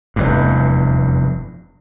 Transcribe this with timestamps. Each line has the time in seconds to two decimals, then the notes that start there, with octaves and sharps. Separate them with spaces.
0.16 F1 E2 G2